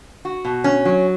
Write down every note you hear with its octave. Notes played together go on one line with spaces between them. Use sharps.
F#4
B2
C#4
F#3